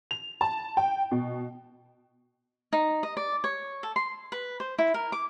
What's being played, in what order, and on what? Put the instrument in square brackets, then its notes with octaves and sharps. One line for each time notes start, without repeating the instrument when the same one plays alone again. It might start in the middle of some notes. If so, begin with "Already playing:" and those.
[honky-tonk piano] F7
A5
G5
B2
[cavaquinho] D#4
D#5
D5
C#5
A4
C6
B4
C5
E4
A#4
D6